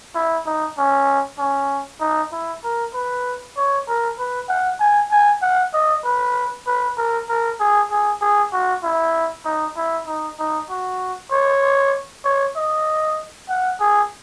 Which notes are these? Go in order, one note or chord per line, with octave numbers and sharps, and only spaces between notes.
E4
D#4
C#4
C#4
D#4
E4
A#4
B4
C#5
A#4
B4
F#5
G#5
G#5
F#5
D#5
B4
B4
A#4
A#4
G#4
G#4
G#4
F#4
E4
D#4
E4
D#4
D#4
F#4
C#5
C#5
D#5
F#5
G#4